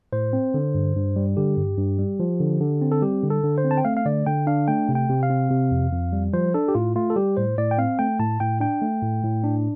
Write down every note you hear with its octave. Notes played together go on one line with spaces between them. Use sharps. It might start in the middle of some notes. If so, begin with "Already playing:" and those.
A2 C5
C4
D3
G2
G2
G3
D3 G4
G2
G2
G3
F3
D3
D3
C4
A4
G3 G4
D3
A4
D3
C5
C4
A5
G5
A3 F5
F5
D3 D5
D3 G5
D4 F5
A3 G5
C3
G5
C3
F5
C4
C3
F2
F2
G3
F3 C5
D4 A4
G4
A2 F4
A3 F4
A4
G3 G4
A2 C5
A2 D5
G5
C4 F5
A3 G5
A2 A5
A2 G5
D4 G5
A3
A2
A2
D4